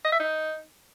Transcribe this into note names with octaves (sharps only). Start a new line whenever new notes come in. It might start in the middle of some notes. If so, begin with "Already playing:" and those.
D#5
E5
D#4